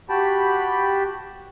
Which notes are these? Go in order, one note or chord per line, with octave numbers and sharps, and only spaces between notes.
F#4 G4 G5 A5 B5